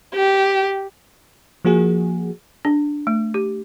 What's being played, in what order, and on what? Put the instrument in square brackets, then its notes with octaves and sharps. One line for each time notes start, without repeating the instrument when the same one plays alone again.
[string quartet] G4
[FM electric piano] F3 A#3 F#4 G#4
[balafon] D4
A3
G4